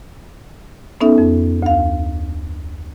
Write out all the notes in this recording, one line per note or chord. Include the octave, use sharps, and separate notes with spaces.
B3 C#4 D#4 A4 E5
F2
D2 F5